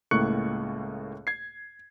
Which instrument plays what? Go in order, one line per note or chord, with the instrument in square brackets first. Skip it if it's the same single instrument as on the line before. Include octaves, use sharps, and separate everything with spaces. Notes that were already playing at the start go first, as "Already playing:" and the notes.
[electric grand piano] C#2 A2 A#3 C#6 F#6 C#7
G#6 C7